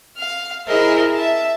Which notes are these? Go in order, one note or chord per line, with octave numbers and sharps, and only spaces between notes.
F5 F6
E4 G#4 A#4 C5 D#5 E5
E5 A5